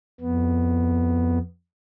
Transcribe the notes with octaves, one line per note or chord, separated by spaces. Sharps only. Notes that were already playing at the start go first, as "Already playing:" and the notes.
F2 B3